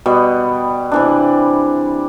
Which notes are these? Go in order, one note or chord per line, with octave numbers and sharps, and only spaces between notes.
B2 G3 B3
C3 E3 D4